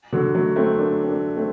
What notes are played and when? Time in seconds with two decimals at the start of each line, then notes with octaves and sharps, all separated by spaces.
0.13 D3 F#3
0.34 F#3 A3
0.56 A3 C4
0.78 A#3 D4
1.02 C4
1.07 A#3 D4
1.36 A3 C4